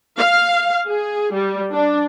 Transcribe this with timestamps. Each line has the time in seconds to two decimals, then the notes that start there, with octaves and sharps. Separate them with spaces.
0.19 F5
0.88 G#4
1.34 G3
1.74 D4